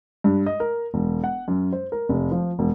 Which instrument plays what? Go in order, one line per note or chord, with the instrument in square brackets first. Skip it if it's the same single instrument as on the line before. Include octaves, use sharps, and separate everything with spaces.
[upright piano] G2
D#5
A#4
E1
F#5
F#2
C5
A#4
F1
F3
E1